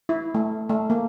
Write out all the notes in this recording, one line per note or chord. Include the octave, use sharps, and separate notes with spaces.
E4
A3
A3
A#3